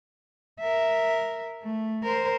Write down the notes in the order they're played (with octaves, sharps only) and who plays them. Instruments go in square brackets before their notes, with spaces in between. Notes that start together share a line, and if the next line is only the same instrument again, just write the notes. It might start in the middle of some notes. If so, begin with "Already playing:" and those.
[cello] A#4 E5
A3
A#4 C5